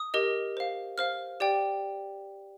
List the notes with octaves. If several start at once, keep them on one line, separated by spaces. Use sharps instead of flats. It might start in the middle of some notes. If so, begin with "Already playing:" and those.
Already playing: D#6
G4 A#4 D#5
C5 F5
C5 F5 F6
G4 D5 G5